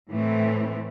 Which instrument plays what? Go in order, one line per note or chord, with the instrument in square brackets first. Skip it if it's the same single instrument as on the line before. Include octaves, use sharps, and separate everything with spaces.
[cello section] A2 E3 A3 C4